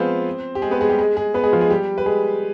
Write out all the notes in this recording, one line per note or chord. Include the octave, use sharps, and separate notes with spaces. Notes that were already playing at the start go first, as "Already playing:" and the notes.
Already playing: F3 G#3 B3 C4 F4 G#4 B4 C5
G4
G#3 G#4
B3 B4
G#3 G#4
G3 G4
G#3 G#4
G#3 G#4
B3 B4
G#3 G#4
F3 F4
G#3 G#4
G3 G4
B4
G#3 G#4